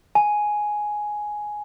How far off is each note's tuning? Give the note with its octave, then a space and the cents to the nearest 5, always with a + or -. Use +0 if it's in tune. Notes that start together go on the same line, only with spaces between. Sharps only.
G#5 +5